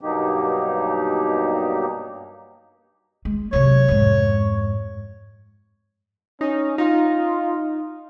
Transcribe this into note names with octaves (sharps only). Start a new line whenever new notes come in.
G2 B2 F#3 A#3 D#4 G4
G#3
C3 F#3 C#5
F2 G#2
C#4 D#4
D#4 F4